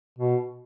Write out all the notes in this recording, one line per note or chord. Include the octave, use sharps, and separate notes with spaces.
B2